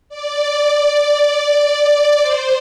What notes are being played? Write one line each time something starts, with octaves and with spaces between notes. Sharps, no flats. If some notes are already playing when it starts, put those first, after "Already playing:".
D5
C5